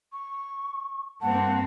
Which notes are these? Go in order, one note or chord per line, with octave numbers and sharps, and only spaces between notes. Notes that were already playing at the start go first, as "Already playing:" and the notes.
C#6
G2 A#3 C4 F#5 A5